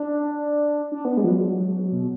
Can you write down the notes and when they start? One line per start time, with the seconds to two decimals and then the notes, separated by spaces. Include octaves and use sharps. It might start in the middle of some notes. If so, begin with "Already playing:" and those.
Already playing: D4
0.92 D4
1.05 B3
1.17 G#3
1.24 F3
1.30 F#3
1.92 B2